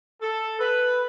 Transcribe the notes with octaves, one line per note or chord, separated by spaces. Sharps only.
A4
B4